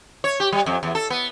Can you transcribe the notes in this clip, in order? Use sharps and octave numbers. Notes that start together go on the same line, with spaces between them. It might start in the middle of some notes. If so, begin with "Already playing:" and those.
C#5
G4
G3
F2
E2
A4
B3